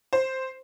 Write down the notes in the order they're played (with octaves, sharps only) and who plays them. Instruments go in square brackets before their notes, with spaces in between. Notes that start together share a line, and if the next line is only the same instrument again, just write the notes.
[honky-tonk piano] C5